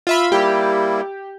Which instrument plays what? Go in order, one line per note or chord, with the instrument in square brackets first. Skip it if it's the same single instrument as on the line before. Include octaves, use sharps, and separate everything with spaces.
[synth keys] F4 E5 B5
[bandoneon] G3 A#3 E4 [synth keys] G4